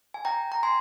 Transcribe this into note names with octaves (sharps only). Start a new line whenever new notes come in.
G#5
G5 A#5
A#5
G#5 C6